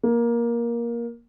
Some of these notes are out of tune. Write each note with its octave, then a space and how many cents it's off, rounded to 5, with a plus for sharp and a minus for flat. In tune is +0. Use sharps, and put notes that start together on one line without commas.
A#3 +15